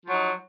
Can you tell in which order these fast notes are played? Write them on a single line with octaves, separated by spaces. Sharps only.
F3 F#3 D#4